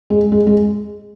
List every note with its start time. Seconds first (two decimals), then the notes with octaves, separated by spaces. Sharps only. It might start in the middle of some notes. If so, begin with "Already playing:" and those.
0.10 G#3
0.32 G#3
0.47 G#3